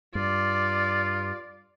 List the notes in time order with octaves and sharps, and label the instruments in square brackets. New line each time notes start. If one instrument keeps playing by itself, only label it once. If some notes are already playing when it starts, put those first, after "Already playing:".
[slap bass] G2 [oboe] F4 [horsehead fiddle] D5